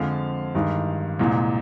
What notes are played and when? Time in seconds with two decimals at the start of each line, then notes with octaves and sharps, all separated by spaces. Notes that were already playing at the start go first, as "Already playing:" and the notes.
Already playing: F2 D3 F3 G#3 F5
0.55 G2 D#3 G#3
1.19 C2 A#2 G#3